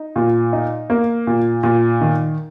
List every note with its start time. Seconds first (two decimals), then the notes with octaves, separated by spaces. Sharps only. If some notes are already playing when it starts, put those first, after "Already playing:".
Already playing: D#4
0.16 A#2
0.53 D#4
0.90 A#3
1.27 A#2
1.63 A#2
2.01 D#3